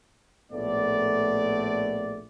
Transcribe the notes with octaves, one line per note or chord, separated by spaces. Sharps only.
A#1 A2 A3 B3 D5